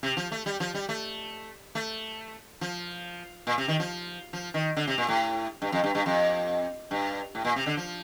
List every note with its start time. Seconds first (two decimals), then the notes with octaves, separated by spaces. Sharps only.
0.03 C3
0.17 F3
0.32 A3
0.46 G3
0.60 F3
0.74 G3
0.89 A3
1.75 A3
2.61 F3
3.47 A#2
3.58 C3
3.68 D#3
3.80 F3
4.33 F3
4.54 D#3
4.77 D3
4.87 C3
4.98 A#2
5.09 A2
5.62 G2
5.72 F2
5.84 G2
5.95 G2
6.06 F2
6.91 G2
7.35 A2
7.45 A#2
7.56 C3
7.66 D3
7.77 F3